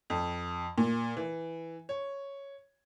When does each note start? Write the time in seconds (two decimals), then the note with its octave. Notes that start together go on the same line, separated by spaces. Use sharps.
0.10 F2
0.78 A#2
1.17 E3
1.89 C#5